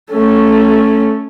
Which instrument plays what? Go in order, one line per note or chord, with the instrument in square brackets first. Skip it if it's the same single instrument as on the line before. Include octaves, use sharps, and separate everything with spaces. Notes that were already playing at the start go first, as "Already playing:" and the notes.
[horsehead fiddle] A3 C#4